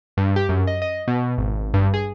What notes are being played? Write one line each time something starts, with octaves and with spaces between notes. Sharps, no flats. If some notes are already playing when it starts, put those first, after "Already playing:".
G2
G4
F#2
D#5
D#5
B2
G#1
G2
G#4